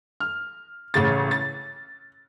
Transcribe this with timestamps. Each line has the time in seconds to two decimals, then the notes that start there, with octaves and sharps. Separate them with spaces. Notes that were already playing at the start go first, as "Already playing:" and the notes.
0.20 F6
0.94 A1 C#3 A6
1.31 A6